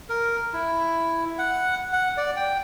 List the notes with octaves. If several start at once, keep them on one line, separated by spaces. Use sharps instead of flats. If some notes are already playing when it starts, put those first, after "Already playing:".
A#4
E4
F#5
F#5
D5
G5